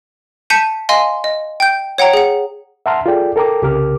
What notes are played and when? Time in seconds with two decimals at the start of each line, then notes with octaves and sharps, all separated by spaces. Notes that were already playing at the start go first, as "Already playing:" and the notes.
0.50 A5 G6 B6 C#7 D#7
0.89 D#5 F5 G#5 C6
1.24 D#5
1.60 G5 G6
1.98 C#5 F#5 G5 A#5
2.13 G#4 F#5
2.86 E5 F#5 A5 A#5 C6 F6
3.06 F4 G#4 A4 D5 G5
3.36 A4 A#4 G5 A#5 D6
3.62 C2 C#3 G4 A#4 D6 F6